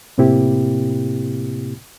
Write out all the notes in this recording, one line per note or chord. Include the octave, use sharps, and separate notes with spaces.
A2 C3 A#3 C4 E4 G4